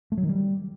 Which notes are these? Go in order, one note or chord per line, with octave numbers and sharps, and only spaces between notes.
A3
F#3
D#3
G3